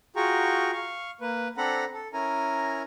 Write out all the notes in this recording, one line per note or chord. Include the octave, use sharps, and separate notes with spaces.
F4 F#4 G#4 G5 A#5 C#6
F5 C#6
A#3 B4
C4 D4 A4 F#5 A#5 B5
A4
C#4 E4 A#4 G#5 A#5